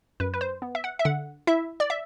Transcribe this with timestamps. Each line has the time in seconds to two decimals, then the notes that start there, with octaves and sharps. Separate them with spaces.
0.20 F#2 B4
0.34 B4
0.41 C5
0.62 B3
0.75 E5
0.84 F#5
0.99 E5
1.05 D3 F#5
1.47 E4 E5
1.80 D5
1.90 E5